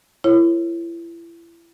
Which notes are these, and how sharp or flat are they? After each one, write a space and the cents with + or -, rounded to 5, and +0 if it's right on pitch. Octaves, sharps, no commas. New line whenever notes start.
E4 +35 A#4 +0 C#5 -25